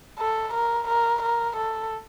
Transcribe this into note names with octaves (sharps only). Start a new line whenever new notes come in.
A4
A#4
A#4
A#4
A4